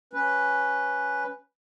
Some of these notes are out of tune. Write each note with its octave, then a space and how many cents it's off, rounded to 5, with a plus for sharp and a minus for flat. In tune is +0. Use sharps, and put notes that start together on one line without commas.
C#4 +0 B4 +0